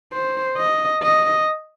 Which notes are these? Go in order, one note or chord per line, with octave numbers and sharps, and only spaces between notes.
C5
D#5
D#5